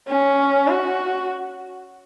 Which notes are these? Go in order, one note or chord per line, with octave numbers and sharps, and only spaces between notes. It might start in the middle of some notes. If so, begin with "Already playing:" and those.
C#4
F#4